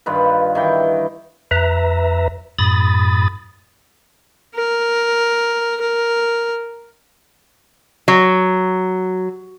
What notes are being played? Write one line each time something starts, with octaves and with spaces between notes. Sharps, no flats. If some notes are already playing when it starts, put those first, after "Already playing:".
G2 D#3 F4 B4
D#3 E3 G5 C#6
F2 B4 E5 A#5
F#2 A2 B5 D#6 A6
A#4
A#4
F#3